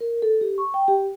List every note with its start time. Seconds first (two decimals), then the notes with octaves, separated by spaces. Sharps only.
0.01 A#4
0.22 A4
0.41 G4
0.58 C#6
0.74 G5
0.88 G4